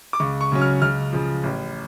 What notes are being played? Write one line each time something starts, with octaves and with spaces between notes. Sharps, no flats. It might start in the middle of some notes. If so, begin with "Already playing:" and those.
D6
C#2 C#6
C#6
C#3 F#3 C#4
F6
C#2 F6
C#3 F3
A1